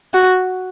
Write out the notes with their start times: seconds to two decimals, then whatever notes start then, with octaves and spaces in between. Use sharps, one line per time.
0.14 F#4